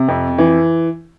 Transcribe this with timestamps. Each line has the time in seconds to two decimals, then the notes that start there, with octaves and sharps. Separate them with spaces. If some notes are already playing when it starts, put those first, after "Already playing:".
Already playing: C3
0.08 F2
0.38 E3